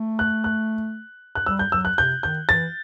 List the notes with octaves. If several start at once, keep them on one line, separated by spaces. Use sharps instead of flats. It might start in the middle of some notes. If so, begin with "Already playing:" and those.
Already playing: A3
F#6
F#6
F#6
G3 E6
G6
F#3 E6
F#6
C3 G6
D#3 G6
E3 A6